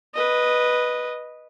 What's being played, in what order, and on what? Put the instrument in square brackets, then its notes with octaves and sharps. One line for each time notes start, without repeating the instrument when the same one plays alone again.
[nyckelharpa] B4 D#5